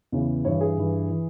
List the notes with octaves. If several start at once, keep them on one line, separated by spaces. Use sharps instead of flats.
E2 C#3 E3
G2 E3 C#5
G#4
G2 E3
E3